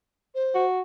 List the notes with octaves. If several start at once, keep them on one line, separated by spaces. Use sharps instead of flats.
C5
F#4